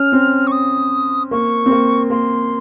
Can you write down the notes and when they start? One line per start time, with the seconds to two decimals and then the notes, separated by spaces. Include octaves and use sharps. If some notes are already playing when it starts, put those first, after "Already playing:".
Already playing: C#4 F6
0.12 C4
0.47 C#6
0.52 D#6
1.31 A#3 C#6
1.66 C4
1.71 A#3
2.10 A#3 C6